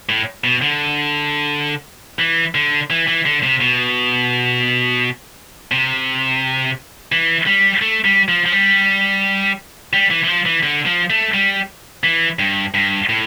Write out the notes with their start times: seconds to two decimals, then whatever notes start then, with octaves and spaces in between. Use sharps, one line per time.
0.09 A2
0.44 B2
0.62 D3
2.19 E3
2.55 D3
2.90 E3
3.08 E3
3.25 D3
3.43 C3
3.61 B2
5.72 C3
7.12 E3
7.46 G3
7.82 A3
8.05 G3
8.28 F3
8.46 F3
8.52 G3
9.93 G3
10.11 E3
10.24 E3
10.27 F3
10.46 E3
10.63 D3
10.86 F3
11.10 A3
11.34 G3
12.04 E3
12.39 G2
12.74 G2
13.09 A2